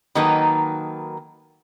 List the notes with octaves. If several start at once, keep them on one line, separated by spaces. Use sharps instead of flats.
D#3 F#3 A#3 D#4 A4 B4